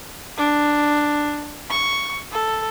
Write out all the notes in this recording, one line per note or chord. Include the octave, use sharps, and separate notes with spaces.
D4
C#6
A4